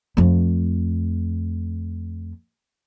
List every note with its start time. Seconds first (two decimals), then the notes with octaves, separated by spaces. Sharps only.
0.17 F2 A3